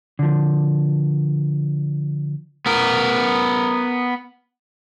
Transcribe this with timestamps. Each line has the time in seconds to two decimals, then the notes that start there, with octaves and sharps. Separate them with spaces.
0.19 D3 F3
2.66 B3 A#4